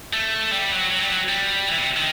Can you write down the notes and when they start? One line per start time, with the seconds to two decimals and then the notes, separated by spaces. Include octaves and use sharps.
0.13 A3
0.52 G3
0.71 F#3
0.91 F#3
1.00 G3
1.10 F#3
1.29 G3
1.68 E3
1.77 C3
1.97 D#3